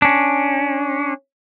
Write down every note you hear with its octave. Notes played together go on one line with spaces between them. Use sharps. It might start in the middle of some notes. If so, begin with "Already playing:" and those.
C#4 D4